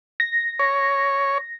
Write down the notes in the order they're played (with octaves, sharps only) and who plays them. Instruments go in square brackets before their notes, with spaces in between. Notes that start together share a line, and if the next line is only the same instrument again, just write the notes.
[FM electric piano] A#6
[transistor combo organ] C#5